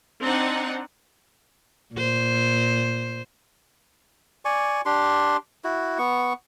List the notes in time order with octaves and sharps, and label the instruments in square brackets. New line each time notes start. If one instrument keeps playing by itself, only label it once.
[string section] C4 D4 D#4 F#5
[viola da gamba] A#2 C5
[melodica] D5 G#5 C#6
D4 G4 C6
E4 F#4
B3 C#6